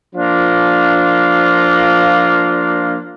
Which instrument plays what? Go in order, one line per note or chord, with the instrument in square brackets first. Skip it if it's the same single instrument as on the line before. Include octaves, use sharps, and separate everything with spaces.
[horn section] F3 A#3 D4 F4